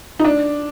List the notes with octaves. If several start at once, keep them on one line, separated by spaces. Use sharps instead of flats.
D#4
D4